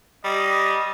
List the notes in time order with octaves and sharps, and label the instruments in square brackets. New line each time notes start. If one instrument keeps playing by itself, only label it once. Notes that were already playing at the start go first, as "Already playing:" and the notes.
[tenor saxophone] G3 [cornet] D#5